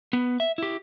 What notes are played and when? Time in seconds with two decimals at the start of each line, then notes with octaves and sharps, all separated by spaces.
0.13 B3
0.40 E5
0.58 E4 G4